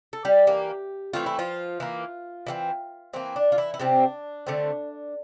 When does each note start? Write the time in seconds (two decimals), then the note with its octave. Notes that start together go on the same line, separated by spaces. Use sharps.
0.13 A4
0.25 G3 G4
0.47 E3 A#3
1.13 E3 A3 C4 F4
1.26 E4
1.39 F3 F4
1.80 E3 A#3
2.47 E3 A3 C4
3.13 E3 A#3 C4
3.36 D4
3.52 F4
3.58 E3 E4
3.74 E4
3.79 C3 G3 C4 D4
4.47 D3 A3 C4